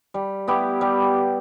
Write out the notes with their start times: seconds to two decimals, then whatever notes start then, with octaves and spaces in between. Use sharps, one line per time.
0.14 G3
0.48 B3 E4 G4
0.81 G3